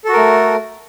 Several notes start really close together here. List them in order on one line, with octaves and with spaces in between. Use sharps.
A4 F#4 A#4 A3